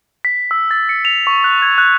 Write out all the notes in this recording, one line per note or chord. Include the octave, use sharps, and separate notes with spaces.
B6
E6
A6
C#7
F7
C#6
F#6
G#6
F#6